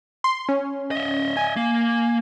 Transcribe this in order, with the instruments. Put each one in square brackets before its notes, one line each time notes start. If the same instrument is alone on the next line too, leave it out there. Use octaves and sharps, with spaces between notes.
[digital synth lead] C6
C#4
[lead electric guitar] D#5 E5
[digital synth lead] G#5
[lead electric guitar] A#3